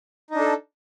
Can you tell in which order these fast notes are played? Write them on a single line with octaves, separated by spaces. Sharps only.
D#4 D4 A4